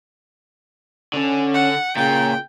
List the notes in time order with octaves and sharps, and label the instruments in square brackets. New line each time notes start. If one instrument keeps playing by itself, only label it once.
[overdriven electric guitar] D3 [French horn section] C#4
[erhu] F#5
[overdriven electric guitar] A#2 [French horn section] C#3 [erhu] G5